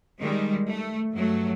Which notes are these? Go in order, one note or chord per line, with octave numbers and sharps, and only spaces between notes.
D#3 G3 G#3
A3
G2 F#3 A3